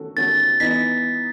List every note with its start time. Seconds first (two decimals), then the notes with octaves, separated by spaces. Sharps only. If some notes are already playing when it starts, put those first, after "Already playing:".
Already playing: D#3 A3 C#4 F#4 A4
0.16 D#3 A3 C#4 F#4 A4 A6
0.60 E3 B3 D#4 B6